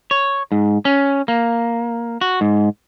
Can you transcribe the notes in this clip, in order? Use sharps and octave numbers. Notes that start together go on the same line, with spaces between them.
C#5
G#2
C#4
A#3
F#4
G#2